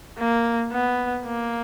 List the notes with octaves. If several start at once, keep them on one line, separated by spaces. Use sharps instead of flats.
A#3
B3
A#3